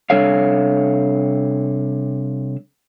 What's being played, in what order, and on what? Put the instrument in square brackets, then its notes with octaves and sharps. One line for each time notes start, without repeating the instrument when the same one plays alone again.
[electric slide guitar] C3 G3 D4 A4 C#5 F5